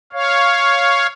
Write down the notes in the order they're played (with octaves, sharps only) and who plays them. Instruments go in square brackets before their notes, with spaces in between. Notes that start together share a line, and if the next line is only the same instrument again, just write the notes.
[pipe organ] C#5 F5